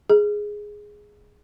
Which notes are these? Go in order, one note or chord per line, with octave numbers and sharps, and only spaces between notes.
G#4